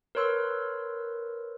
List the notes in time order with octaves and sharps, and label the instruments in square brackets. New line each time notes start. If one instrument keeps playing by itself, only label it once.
[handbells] A#4 B4 C#5 C6 E6